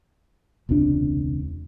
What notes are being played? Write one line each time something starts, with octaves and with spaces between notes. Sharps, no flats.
E1 C#2 C3 D4